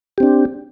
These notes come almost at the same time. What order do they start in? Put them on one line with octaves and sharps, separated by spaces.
G4 C4 D4